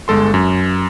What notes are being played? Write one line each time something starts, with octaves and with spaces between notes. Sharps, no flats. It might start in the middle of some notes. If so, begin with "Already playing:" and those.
G1 G#3 A4 C6
F#2